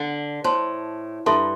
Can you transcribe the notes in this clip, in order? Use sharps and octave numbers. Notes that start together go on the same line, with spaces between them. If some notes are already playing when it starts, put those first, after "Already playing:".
Already playing: D3
A2 C5 A5 C6
G2 E4 A4 E5 A5 C6